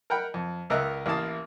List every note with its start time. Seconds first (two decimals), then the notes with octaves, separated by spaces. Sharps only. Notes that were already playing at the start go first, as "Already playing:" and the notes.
0.10 A#4 F#5 G5 B5
0.34 F2
0.70 C#2 A#4 D#5 E5 F#6
1.06 A1 A#3 E4 F5 A5 D#6